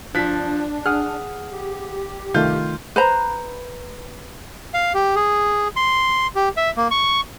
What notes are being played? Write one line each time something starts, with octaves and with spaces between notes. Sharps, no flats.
F3 D4 A5 F#6 B6
G#4 F#5 D#6 F6
G4
C2 D#3 A3 F4 G6
B4 C5 A#5
F5
G4
G#4
C6
G4
E5
A#3
C#6